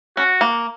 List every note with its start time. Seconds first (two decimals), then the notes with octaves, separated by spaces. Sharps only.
0.17 C#4 F#4
0.41 A#3